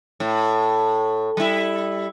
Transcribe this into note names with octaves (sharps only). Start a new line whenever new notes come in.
A2
G3 E4